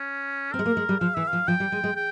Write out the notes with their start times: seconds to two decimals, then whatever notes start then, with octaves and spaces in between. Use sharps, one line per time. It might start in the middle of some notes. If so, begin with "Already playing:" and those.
Already playing: C#4
0.53 C4 A#4
0.59 G#3
0.66 A#3
0.77 G#3
0.89 G3
1.00 F3 F5
1.15 E3 E5
1.28 F3 F5
1.48 F3 G5
1.60 G3
1.72 G#3
1.84 G#3
1.96 G5